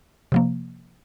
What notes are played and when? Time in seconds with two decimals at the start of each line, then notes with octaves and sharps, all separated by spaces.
0.32 C3 F3 A#3